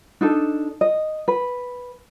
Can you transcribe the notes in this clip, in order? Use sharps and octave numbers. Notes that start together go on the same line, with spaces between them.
D4 D#4 A4
D#5
B4